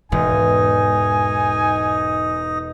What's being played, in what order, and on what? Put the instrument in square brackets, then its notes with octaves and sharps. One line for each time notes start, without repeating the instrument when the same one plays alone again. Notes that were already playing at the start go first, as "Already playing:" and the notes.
[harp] E1 [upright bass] G#2 [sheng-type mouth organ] D#4 [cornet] G#5